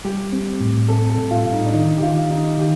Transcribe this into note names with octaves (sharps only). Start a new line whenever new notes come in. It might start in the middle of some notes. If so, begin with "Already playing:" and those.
G3 G4
C4
A2
C4 A4
A4
A2
F4
A2
D#4
D4
D#3 D#4
G4
D#3 F4
D#3 D#4
D#3 G4